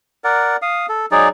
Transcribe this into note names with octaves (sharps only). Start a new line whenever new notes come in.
A#4 D5 F#5
F5 D#6
A4
F#3 D#4 G#4 D5